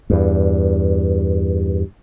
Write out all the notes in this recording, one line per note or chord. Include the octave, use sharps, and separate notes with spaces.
E2 G2